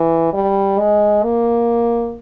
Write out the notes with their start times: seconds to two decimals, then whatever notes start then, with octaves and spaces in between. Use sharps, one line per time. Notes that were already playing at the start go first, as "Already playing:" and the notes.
Already playing: E3
0.33 G3
0.79 G#3
1.24 A#3